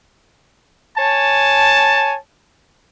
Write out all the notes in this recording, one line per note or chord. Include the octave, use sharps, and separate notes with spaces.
C#5 G#5 A5